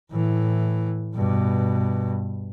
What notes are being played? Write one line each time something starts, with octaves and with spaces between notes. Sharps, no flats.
A2 E3
G2 B2